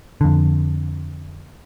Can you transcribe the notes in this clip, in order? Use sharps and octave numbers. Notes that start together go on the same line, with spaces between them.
F2 D3